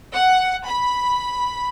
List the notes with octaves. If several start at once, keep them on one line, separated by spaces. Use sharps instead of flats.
F#5
B5